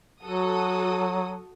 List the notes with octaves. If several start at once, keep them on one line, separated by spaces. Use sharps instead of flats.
F#3 F#4 A4 D#6